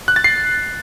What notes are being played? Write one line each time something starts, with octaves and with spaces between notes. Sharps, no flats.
F#6
A6
C7